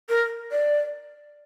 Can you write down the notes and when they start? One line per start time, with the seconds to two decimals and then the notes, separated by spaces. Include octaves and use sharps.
0.09 A#4
0.52 D5